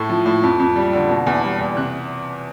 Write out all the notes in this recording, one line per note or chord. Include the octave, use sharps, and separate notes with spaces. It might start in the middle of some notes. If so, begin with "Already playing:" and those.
Already playing: A2 A3
F3
A2
F2
F2
G3
D3
B2
E2
G3
E2
C3 F#6